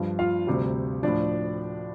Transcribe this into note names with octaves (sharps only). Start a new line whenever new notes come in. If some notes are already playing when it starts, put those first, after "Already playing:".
Already playing: G2 F3
F4 F5
D2 C3 G3
A2 F3 D4 D5